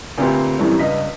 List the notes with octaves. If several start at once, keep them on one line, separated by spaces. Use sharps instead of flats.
D2 A#2 C4 G4 B4 C6
F#2 A2 C3 E3 G3
C#2 G2 D#5 B6